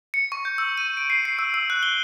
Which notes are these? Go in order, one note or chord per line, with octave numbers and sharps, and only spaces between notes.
C#7
C#6
G6
E6
D#7
D7
C7
C7
E6
E6
F#6
G7